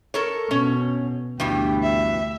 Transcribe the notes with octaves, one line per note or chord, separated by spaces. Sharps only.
A4 A#4 C#5
B2 C#4 C#5
D2 G2 B2 E3 G4
E5